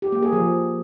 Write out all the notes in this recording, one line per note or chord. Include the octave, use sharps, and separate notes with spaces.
G4
A#3
G#4
F3